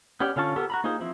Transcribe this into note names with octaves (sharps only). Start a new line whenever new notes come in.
B3 C#4 G4 D5 G5
D3 C#4 F4 A5 C#6
B3 G4 A4 A#4
F#4 A#5 B5
A#3 D#4 F4 G#4 C5
E3 F3 C4 E4